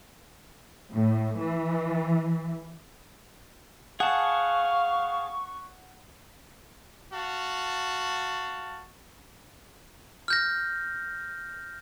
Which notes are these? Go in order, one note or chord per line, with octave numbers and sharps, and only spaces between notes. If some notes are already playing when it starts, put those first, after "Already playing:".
A2
E3
G#4 F5 F#5 A5 C#6
F#4 F5 A5
F6 G6 A#6